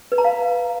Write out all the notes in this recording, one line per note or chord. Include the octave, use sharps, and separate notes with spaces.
B4
A#5
F5